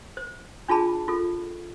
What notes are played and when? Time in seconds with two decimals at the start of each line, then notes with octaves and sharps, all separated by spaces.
0.17 C5
0.68 D4 F4 G#4 A5 B5
1.08 F4 A4